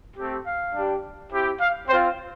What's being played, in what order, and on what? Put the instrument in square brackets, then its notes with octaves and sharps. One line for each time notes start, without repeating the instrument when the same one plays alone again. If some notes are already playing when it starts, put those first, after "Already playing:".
[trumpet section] A3 C4 G4
F5
G3 D4 G4
C4 E4 G4
F5
C4 C5
F4